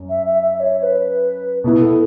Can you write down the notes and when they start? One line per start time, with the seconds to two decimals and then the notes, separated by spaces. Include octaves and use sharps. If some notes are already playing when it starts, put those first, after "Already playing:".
Already playing: F#2
0.09 E5
0.26 E5
0.43 E5
0.60 C#5
0.78 C#5
0.83 B4
1.64 B2 B3 E4
1.81 A4